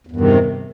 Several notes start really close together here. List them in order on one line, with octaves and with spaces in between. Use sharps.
E2 G2 D#3 C3